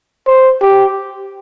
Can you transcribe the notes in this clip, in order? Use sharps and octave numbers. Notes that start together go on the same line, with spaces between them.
C5
G4